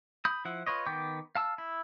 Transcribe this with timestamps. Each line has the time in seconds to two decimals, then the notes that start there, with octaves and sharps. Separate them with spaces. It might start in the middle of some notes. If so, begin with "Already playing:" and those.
0.25 B5 D#6 G6
0.45 F3 E4 F#5
0.67 F4 B4 C#5 D#5
0.86 D#3 B3 G5 D6 G6
1.35 F5 A5 E6
1.58 E4